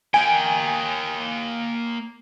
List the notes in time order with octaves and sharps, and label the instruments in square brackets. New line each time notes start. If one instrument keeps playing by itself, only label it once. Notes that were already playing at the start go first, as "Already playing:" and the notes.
[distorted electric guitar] A#3 G5 [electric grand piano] G#5